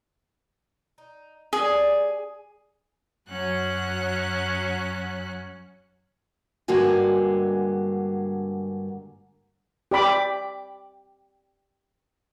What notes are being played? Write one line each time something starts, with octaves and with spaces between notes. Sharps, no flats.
D#4
G3 C#4 G#4 D5
F#2 F#3 C#4 F#4 F#6
G2 D3 G#3 A#3 F#4 G#5
G4 D5 B5 D6